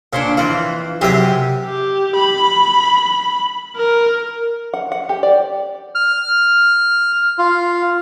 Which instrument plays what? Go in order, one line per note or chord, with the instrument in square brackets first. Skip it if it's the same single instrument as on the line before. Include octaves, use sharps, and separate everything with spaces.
[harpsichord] A#2 [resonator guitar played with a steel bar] D4 C5 C#5
[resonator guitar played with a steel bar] F2 E3 [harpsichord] F4
[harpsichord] F#2 C3 E5 [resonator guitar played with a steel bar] G4 G#4
[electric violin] G4
B5
A#4
[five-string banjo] F#5
F#5
G4
D5
[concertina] F6
F4